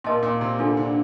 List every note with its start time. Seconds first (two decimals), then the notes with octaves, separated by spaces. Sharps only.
0.04 A#2 A#4 D#5 A5 C6
0.23 A#2
0.41 C3
0.59 D3 D4 F4 A4
0.77 D3